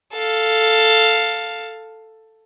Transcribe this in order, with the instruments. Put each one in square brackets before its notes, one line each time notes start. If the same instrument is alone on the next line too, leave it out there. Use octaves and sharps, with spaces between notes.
[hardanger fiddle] A4 F5